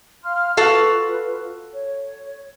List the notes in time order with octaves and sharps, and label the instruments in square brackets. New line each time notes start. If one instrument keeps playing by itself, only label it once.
[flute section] F5 C6 F6
[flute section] F4 B4 [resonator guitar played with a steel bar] F#4 A4 F5
[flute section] C#5